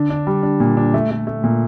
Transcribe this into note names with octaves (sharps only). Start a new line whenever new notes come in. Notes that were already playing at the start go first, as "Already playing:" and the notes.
Already playing: D3 D4
D4
G3
D4
A#2
D4
A3
A3
A3
A#2